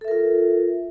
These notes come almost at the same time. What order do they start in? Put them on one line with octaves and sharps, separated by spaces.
A4 E5 A#4 F4